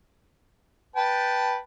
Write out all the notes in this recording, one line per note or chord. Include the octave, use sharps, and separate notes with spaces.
B4 G5 A5